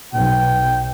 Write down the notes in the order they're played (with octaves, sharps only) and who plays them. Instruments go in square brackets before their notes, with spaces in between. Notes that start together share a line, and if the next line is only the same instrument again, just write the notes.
[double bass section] B1 [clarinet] G5